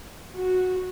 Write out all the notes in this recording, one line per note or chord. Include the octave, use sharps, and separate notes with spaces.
F#4